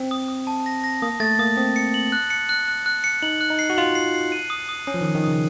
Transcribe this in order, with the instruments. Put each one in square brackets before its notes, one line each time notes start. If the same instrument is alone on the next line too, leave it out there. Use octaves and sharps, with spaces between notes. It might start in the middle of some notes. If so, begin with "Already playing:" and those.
Already playing: [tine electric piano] C4
[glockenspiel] D#6
D#6
A5
A#6
A#6
[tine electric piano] A#3 [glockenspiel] D#6
[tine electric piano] A3 [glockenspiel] A6
[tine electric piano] A#3 [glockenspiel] D#6
[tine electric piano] C4 [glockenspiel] D#6
[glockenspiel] C#7
F#7
F#6
C#7
F#6
F#6
F#6
C#7
[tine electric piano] D#4 [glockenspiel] F#7
[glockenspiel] F#6
[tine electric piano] D#4
[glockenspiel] C7
[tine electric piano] F#4
[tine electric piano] F4 [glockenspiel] F#7
[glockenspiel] C7
C7
D#7
D#6
D#6
[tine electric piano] C#4 [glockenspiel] D#6
[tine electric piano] F3
D#3
[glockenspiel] D#6
[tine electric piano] D#3
[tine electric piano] C#3 [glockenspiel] D#6